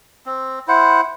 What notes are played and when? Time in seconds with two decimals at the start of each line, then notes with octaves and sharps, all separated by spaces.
0.26 C4
0.68 E4 C5 F#5